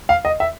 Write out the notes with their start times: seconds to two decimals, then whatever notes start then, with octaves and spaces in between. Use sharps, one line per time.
0.09 F5
0.25 D#5
0.40 E5